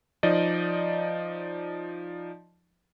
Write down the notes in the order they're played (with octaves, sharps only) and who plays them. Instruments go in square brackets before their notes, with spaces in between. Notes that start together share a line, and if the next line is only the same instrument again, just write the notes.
[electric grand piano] F3 D#4 D5 D#5